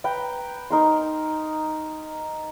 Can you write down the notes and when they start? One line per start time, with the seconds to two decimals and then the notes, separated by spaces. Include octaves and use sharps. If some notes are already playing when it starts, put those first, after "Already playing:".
0.04 B4 G5 A#5
0.70 D#4 A#4 C6